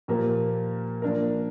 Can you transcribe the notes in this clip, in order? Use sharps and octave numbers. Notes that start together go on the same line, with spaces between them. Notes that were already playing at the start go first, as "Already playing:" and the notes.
A#2 F3 A#3 G4 A#4
F3 A#3 D4 A#4